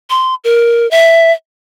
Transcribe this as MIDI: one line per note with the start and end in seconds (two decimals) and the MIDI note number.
0.10 0.35 84
0.44 0.89 70
0.91 1.32 76